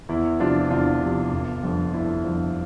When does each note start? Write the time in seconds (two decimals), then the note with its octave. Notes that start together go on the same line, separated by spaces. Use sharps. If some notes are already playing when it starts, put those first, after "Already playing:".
0.09 E2 E4
0.40 C3 F3 D4 F4
0.71 E2 D4 F4
1.01 C3 F3
1.32 G1
1.63 F2 D3 F3
1.93 G1 E4
2.25 F2 D3 F3